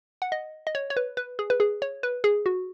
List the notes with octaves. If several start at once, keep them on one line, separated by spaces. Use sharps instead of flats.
F#5
D#5
D#5
C#5
C#5
B4
B4
G#4
B4
G#4
C#5
B4
G#4
F#4